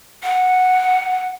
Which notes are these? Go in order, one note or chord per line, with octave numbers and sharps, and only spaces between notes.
F#5